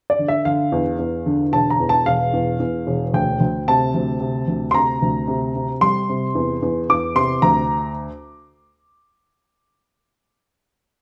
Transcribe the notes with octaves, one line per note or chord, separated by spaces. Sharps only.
D5
D3
E5
D3 F5
E2
E2
D3
E1 A5
A#5
E2
A5
E1 F5
E2
E2
E1
D2 G5
D2
C3 A5
D2
C3
D2
C6
C3 A#5
D2
C3
C3
G3 C6
C3
E2
E2
E2 D6
C3 C6
D2 A#5